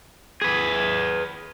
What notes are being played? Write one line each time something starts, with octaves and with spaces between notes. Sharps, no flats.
G#4 B4